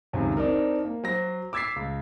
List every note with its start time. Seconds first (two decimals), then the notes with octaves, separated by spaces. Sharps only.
0.13 C#2 F#2 C3 D#3 F#3
0.37 C4 D4 D#4 A#4
0.85 A#3
1.04 F#3 C5 A#6
1.53 D6 E6 G#6 A6 B6 C7
1.76 C#2